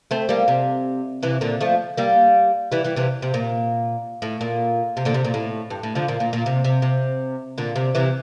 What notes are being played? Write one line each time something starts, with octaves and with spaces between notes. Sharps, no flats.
A3 C4
G3 A#3
C3
C3 E3
A#2 D3
F3 A3
G3 A#3
E3 G3
E3 G3
C3 E3
C3
A#2
A2
A#2
C3
A#2 D3
C3
A#2
A2
G2
A2
D3 F3
A#2
A#2
A#2
C3
C3
C3
A#2 D3
C3
C3 E3